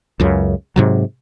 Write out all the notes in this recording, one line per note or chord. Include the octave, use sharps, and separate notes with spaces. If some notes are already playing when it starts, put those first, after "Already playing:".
C#2 F#2 C#3
G#2 C3 F#3